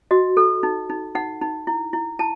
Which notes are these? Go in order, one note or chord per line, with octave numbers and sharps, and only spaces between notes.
F#4 D#5
A4
D#4
D#4
D#4 F#5
D#4
E4
E4
E4 A5